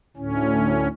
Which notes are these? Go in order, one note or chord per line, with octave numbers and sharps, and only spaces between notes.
D2 A2 C#4